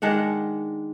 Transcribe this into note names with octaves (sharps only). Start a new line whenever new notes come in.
D#3 G#3 D4 F#5